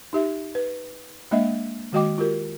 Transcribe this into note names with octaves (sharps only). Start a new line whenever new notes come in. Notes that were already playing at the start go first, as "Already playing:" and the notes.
D#4 G4 E5
B4
G#3 A#3 D4 D#5 E5
D#3 G#3 F#4 D#5 G5 D6
F4 G4 A#4